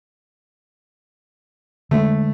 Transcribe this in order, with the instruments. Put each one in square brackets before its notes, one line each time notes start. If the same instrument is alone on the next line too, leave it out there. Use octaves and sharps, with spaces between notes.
[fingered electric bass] D3 G#3 [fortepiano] A3